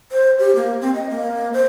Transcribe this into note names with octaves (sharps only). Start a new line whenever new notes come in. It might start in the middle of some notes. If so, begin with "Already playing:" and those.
C5
G4
A#3
C4
D#5
A#3
C5